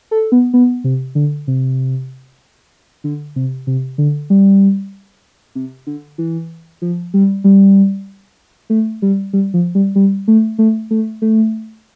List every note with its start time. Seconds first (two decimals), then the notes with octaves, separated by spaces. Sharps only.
0.11 A4
0.32 B3
0.53 B3
0.84 C3
1.15 D3
1.47 C3
3.04 D3
3.36 C3
3.67 C3
3.98 D3
4.30 G3
5.55 C3
5.87 D3
6.18 E3
6.82 F3
7.14 G3
7.44 G3
8.70 A3
9.02 G3
9.33 G3
9.54 F3
9.75 G3
9.95 G3
10.28 A3
10.58 A3
10.91 A3
11.22 A3